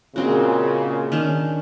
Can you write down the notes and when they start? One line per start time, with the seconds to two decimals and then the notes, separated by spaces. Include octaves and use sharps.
0.16 A#2 C#3 G#3 C4 F#4
1.12 D#3 C#4 D4